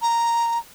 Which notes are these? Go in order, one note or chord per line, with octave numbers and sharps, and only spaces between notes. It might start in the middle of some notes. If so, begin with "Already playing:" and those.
A#5